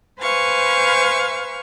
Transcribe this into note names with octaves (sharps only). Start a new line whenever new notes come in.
B4 C5 F5 G#5 C#6